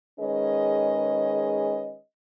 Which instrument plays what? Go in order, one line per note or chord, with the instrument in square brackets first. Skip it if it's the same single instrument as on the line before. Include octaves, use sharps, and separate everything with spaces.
[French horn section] D#3 G#3 C#4 G#4 B4 D#5